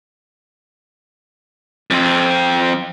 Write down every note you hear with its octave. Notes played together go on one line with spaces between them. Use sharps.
F2 C4